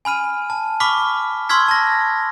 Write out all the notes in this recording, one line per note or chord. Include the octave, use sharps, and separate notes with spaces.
G#5 B5 F6 D#7
A5
B5 C#6 D6 F6 B6
C6 C#6 E6 F6 G#6 B6
A5 A#6